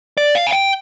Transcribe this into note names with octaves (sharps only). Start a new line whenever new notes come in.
D5
F5
G#5
G5